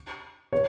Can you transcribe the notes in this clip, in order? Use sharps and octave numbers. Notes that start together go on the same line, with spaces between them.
C#5